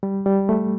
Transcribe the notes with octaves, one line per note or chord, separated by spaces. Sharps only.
G3
G3
A3